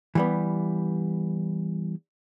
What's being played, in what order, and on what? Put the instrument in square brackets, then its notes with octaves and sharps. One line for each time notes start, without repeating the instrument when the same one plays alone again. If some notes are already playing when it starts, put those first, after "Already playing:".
[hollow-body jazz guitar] E3 G3 B3